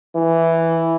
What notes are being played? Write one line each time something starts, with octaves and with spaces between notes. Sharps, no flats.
E3